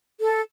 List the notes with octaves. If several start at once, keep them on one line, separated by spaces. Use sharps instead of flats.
A4